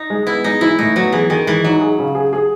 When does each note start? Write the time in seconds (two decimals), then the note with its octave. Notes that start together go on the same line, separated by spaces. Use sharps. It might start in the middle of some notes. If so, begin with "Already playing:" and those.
Already playing: D#4
0.10 G#3
0.27 B3 E4
0.44 G#3 D#4
0.61 E3 E4
0.79 A2 D#4
0.96 F#3 B3
1.12 E3 G#4
1.30 D#3 G#4
1.46 E3 G#3
1.64 F#3 D#4
1.81 G#4
1.99 C#3
2.15 G#4
2.33 G#4